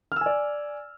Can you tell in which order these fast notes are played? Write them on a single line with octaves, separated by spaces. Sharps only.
F6 E6 G#5 D5